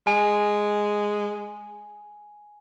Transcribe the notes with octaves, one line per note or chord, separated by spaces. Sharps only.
G#3 G#5